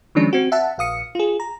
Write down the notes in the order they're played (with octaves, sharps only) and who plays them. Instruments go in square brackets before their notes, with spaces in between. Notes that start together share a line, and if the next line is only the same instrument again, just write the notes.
[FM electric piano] D#3 F3 G#3 C#4 D4
C4 F#4
E5 F#5 A5
A#1 F5 D#6 C#7
F4 G#4
A#5